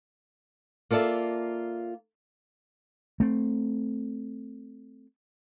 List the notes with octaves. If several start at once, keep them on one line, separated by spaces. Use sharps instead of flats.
A#3 F4 A4 D5 E5
A3 C4